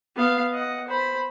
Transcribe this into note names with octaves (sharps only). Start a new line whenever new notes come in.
B3 F5
D#5 F#5
C5 B5